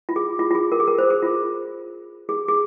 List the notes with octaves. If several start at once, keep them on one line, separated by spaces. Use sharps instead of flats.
F4
G#4
F4
F4
G#4
A#4
G#4
A#4
C5
G#4
F4
G#4
G#4